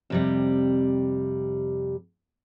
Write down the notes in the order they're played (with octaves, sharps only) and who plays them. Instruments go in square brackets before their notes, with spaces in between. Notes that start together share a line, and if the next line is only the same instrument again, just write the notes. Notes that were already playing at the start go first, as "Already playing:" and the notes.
[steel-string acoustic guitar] F2 C3 G3